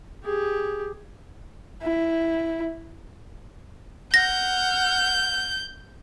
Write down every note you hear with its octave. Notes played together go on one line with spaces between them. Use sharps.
G4 G#4
E4
F#5 F6 G6 A#6